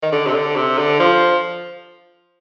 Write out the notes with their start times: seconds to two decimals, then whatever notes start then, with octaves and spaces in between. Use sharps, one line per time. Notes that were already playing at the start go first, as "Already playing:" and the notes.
0.03 D#3
0.12 D3
0.27 C3
0.35 D3
0.56 C3
0.79 D3
1.00 F3